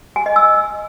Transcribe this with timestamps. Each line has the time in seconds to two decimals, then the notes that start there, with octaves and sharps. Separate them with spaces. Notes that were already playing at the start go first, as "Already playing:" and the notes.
0.16 G#5
0.26 D#5
0.36 E6